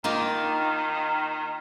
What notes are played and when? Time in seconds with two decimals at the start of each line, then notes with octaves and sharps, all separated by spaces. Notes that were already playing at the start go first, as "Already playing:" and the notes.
0.04 D#3 A#3 D#4 F4